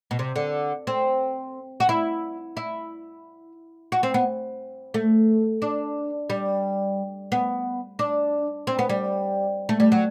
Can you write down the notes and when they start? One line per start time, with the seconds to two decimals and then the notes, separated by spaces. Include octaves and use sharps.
0.11 B2
0.19 C3
0.36 D3
0.87 C4
1.80 F#4
1.89 E4
2.57 E4
3.92 F#4
4.03 C4
4.14 B3
4.94 A3
5.62 D4
6.30 G3
7.32 B3
7.99 D4
8.67 C4
8.79 B3
8.89 G3
9.69 A3
9.80 G3
9.92 F#3